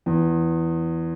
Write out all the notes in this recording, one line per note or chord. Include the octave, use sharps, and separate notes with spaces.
E2